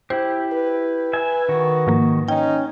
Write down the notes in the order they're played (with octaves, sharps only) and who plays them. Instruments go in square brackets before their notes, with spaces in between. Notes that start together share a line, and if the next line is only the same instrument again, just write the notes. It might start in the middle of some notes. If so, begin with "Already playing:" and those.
[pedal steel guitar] E4 G4 [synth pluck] C5
[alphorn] B4
[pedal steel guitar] E5 G#5
D#3 F#4
[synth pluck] G#2 F3 A#3
[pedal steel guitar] C#4 [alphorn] D#4 [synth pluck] G5